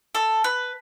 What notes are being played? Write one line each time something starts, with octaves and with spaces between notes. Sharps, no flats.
A4
B4